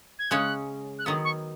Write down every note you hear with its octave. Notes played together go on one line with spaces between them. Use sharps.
G#6
C#3 G#3 C#4 F#6
F#6
D#3 F#3 B3 D#6
C#6